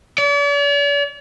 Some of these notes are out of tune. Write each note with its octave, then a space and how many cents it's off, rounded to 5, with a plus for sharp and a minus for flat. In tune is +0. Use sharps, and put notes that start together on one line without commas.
D5 -45